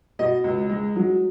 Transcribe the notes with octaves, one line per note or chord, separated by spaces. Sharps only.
B2 D#5
C#2
G#3
F#3